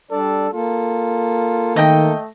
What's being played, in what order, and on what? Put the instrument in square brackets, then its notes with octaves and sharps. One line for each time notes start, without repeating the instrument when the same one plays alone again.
[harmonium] G3 D4 D5 [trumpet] A4
[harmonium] A#3 A4 [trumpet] F4
[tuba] D#3 [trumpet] A3 [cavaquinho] D#5 G5